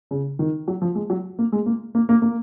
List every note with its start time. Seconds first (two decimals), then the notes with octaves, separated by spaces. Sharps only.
0.11 C#3
0.39 D#3
0.68 F#3
0.82 F3
0.95 G#3
1.10 F#3
1.39 A#3
1.52 G#3
1.66 A#3
1.95 A#3
2.09 A#3
2.22 A#3